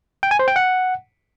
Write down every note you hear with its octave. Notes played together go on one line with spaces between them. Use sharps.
G5
G#5
C5
G5
F#5